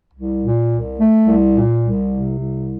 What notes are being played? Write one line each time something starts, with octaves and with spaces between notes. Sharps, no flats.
C2
A#2
C2
A3
C2
A#2
C2
C3
C2